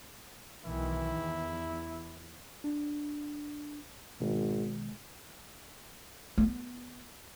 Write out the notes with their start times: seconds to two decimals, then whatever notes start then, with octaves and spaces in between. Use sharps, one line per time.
0.64 B1 D#3 E3 E4
1.19 E2
2.64 D4
4.20 G#1 B2 D#3 G#3
6.38 B3